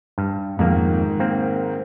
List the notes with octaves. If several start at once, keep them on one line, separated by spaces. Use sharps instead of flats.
G2
F2 G#2 D#3 A#3
A#3 C4